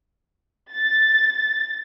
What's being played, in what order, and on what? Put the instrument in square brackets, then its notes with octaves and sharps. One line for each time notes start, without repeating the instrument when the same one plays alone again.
[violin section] A6